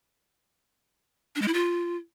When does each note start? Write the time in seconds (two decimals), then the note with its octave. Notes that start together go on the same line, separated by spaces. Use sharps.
1.36 D4
1.42 G#3
1.48 E4
1.54 F4